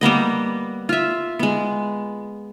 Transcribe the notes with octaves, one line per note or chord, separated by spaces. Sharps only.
G3 A#3 B3 D#5
F4 E5
G#3 B3